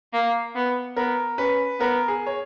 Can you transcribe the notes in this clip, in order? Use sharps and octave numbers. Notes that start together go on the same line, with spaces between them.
A#3
B3
B3 A#4
C#4 B4
B3 A#4
G#4
C#5